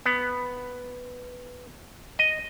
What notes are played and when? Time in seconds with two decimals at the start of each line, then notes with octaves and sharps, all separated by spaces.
0.06 B3
2.19 D#5